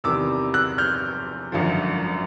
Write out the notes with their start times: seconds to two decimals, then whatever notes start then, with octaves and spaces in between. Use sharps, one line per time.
0.04 E2 C3 D#3 G3 D6 E6
0.54 E6 F#6
0.78 F6 G6
1.52 G#1 F#2 D3 F3